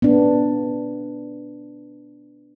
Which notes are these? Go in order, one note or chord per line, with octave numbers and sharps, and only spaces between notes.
B3 D4